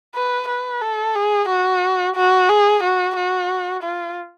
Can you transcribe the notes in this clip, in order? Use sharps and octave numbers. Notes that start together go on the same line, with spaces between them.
B4
B4
A4
G#4
F#4
F#4
G#4
F#4
F#4
F4